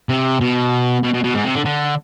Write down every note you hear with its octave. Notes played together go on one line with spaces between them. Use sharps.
C3
B2
B2
B2
B2
G#2
C3
D3
D3